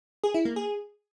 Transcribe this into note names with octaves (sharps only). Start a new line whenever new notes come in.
G#4
E4
A#3
G#4